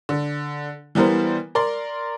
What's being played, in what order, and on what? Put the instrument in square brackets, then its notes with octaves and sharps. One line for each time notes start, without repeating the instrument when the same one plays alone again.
[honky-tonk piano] D3
E3 G3 B3 A#4 C5
A#4 D5 C6